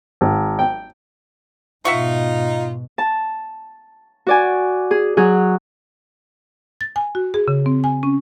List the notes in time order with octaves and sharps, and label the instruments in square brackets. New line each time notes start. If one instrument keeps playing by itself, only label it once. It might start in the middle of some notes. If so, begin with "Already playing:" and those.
[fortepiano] G#1
G5
[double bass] G#2 B2 [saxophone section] D#4 F4 [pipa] E5 F#5 C#6
[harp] A5
F#4 D5 G#5
G#4
F#3 G#4 F#6
[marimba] A6
G#5
F#4
G#4
C#3
C4
G#5
C#4